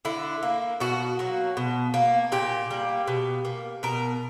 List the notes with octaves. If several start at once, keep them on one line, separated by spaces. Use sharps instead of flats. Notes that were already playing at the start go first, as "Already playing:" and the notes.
D3 E4
A#3
B2 F#4
F#3 A#3
B2
A#3
A#2 G4
G3 A#3
B2
A#3
B2 A#4